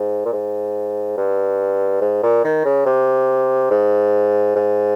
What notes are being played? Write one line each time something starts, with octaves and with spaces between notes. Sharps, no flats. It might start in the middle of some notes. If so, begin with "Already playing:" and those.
Already playing: G#2
A#2
G#2
G2
G#2
A#2
D#3
C#3
C3
G#2
G#2